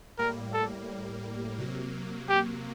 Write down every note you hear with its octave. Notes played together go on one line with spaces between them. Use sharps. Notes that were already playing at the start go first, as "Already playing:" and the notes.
A2 G3 A#3 A#4
A4
C3 F#3 A#3
G4